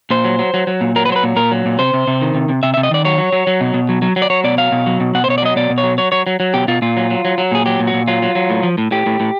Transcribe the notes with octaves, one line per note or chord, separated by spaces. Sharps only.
A#2 C5
F#3
F#3
F#3
F#3
A#2
F#3 A#4
B4
F#3 C5
B4
A#2
A#2 A#4
F#3
A#2
C3 C5
C3
C3
D#3
C3
C3
C3 E5
E5
C3
D#5
D#3 D5
F#3 C#5
F#3
F#3
F#3
B2
B2
F#3
F#3
F#3
D5
F#3 C#5
B2 D5
F#3 F5
B2
F#3
B2
B2 F#5
C5
B2 C#5
D5
F#3 D#5
B2 D5
B2
C#5
F#3
F#3 C#5
F#3 C#5
F#3
F#3
B2 G4
B2 F4
A#2 F4
F#3
F#3
F#3
F#3
A#2 G#4
F#3 G4
A#2
F#4
A#2
F#3 F4
F#3
F#3
A2
F3
A2
A2 G4
A2
A2